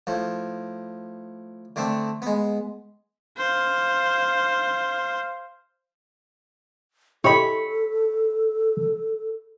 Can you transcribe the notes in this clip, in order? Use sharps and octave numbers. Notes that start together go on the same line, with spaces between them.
A2 F3
D3 A3 C4 D4
G#3 B3
C5 F5
E4 G4 A4 C#5 D#5 B5